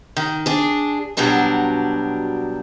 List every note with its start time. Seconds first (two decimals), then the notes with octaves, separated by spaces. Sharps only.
0.17 D#3
0.46 D4 G#4
1.17 B2 F#3 G3 D4 A#4